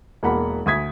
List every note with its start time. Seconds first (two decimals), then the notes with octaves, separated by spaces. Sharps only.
0.23 E1 A#3 F#5 B5
0.66 D2 D#6 G#6 B6